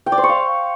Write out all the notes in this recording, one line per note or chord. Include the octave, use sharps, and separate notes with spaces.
G5
D5
C5
C#6
F5